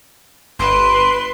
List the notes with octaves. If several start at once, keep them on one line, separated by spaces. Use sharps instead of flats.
G1 B4 C6 D7 E7